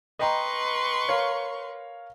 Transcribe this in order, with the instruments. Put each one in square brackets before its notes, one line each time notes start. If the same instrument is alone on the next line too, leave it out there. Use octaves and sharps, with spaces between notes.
[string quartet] B4 C6 C#6 [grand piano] D#5 G5 A#5
[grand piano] A#4 C#5 F5